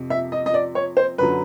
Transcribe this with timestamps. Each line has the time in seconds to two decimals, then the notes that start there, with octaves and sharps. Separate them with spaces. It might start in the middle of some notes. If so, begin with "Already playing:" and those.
Already playing: F2 C3 F3
0.10 E5
0.32 D#5
0.46 D#5
0.54 D5
0.75 C#5
0.97 C5
1.18 F#2 D3 F#3 B4